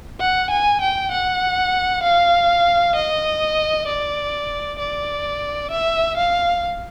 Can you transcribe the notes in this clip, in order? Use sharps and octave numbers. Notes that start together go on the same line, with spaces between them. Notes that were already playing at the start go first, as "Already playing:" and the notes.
F#5
G#5
G5
F#5
F5
D#5
D5
D5
E5
F5